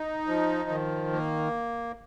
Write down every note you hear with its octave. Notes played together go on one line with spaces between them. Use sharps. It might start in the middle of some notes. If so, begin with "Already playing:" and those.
Already playing: D#4
F3
D#3
A#3